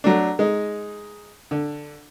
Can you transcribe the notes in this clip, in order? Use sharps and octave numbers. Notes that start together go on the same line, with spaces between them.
F#3 A3 D4
G#3 D#4
D3